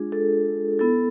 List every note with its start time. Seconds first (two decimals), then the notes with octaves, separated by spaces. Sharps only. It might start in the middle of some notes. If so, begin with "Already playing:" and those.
Already playing: G#3 D4 F4 G#4
0.12 A4
0.79 B3 E4 A4